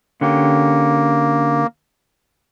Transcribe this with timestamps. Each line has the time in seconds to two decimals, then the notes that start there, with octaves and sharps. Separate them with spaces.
0.21 D3 A#3 C#4 G4